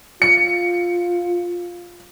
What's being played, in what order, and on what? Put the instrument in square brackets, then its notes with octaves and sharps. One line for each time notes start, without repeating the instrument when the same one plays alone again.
[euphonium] F4 [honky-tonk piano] C#7